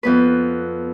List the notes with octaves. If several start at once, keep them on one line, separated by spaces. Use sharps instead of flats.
F2 B3 B4